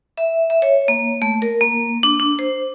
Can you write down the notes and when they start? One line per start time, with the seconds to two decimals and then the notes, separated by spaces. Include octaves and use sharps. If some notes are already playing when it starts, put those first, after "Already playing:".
0.18 E5
0.50 E5
0.62 C#5
0.88 A#3
1.22 A3
1.42 A#4
1.61 A#3
2.03 D4
2.20 D4
2.39 C5